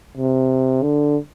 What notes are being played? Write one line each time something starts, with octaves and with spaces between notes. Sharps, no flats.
C3
D3